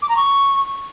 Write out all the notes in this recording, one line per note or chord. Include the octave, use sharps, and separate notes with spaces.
D6
A#5
C#6